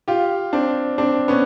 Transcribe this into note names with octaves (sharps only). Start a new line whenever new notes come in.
F4 G4
C4 D4
C4 D4
B3 C#4